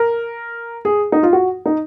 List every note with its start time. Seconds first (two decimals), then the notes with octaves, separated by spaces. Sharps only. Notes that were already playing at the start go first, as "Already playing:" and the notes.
Already playing: A#4
0.85 G#4
1.12 D#4
1.23 F4
1.33 F#4
1.66 D#4